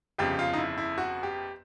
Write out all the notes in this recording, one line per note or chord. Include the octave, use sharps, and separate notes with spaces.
G1 F2 C#3 G4
F4
D#4
E4
E4
F#4
G4